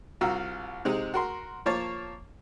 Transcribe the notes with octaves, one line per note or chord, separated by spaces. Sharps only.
C2 F4 F#4 A#5 E6
C3 G#3 D#4
F#4 A#4 C6
F3 A#3 C#5 A5